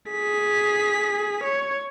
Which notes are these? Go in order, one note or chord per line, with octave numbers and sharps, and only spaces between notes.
G#4 B6
C#5